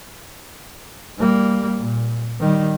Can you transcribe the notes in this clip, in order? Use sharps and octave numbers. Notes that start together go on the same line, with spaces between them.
G3 A#3
A#2
D#3 G3